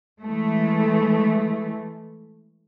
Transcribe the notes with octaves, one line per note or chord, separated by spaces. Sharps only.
E3 G#3 A3